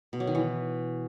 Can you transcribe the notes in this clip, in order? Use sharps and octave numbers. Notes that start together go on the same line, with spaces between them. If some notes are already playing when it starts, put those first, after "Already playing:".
B2
F#3
D#3
E3